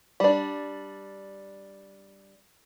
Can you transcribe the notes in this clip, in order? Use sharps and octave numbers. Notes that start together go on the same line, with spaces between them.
G3 D4